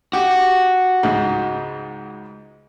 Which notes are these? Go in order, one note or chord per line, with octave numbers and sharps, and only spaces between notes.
F#4 G4 D6
C#2 G#2